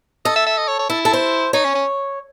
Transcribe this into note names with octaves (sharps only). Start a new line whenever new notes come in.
A4 D#5
E5
E5
D#5
C#5
C#5
E4 A4
A4
C5
D#4 C#5
C#4
C#4